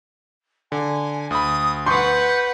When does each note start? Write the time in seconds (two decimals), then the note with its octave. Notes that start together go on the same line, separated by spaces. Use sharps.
0.72 D3 G#5
1.31 D2 B5 D#6
1.86 B4 F#5 C6 C#6 G6